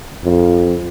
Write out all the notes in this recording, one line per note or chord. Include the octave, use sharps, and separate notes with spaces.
F2